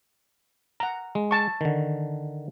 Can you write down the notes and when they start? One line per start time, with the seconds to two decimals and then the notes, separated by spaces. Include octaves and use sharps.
0.80 F#5 A#5
1.15 G#3
1.31 A5 C#6
1.61 D3 D#3